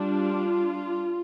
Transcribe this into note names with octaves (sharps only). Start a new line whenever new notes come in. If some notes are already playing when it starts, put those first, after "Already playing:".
Already playing: G3 D4 F4